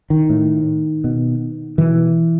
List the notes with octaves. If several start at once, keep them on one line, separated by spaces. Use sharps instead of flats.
D#3
A2
B2
B2 E3